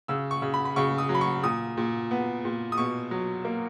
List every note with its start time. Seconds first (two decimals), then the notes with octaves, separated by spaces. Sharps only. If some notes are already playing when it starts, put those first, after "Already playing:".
0.08 C#3 E6
0.31 C#6
0.42 C#3
0.54 B5
0.65 B5
0.76 C#3 C#6
0.98 D#6
1.09 F#3
1.15 B5
1.21 C#6
1.43 A#2 D#6
1.77 A#2
2.11 B3
2.45 A#2
2.72 D#6
2.78 B2 C#6
3.11 F#3
3.45 A#3